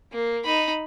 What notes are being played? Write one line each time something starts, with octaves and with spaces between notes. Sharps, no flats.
A#3
D#4 B5